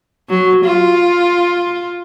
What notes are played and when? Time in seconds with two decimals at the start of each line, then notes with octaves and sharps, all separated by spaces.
0.29 F#3
0.65 F4